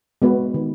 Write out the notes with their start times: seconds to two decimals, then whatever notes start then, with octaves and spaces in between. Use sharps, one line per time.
0.22 G#3 B3 F#4 B4
0.54 D#3